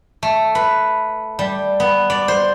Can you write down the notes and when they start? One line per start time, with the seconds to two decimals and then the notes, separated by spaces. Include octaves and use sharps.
0.23 A3
0.55 B4
1.39 G3
1.80 B3
2.10 D5
2.28 C5